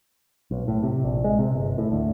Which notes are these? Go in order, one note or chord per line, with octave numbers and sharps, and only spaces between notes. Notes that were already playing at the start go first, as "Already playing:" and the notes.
B1
A2
C3
A#1
G#3
C3
G1
A2
D2